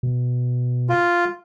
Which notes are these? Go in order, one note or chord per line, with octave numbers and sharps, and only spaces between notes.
B2
F4